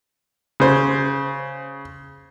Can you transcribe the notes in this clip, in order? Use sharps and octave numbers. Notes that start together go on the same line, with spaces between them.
C#3 C5